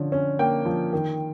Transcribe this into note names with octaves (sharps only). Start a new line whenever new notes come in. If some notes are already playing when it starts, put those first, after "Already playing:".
Already playing: D3 F3 C#4
C#4
A#3 G5
F3
D#3